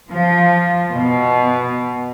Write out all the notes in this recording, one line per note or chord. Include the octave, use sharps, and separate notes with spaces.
F3
B2